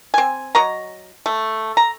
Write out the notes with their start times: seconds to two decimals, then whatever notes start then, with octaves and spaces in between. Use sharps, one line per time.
0.14 C4 G#5
0.55 F#3 C#5 D#5 A#5
1.26 A3
1.77 A#5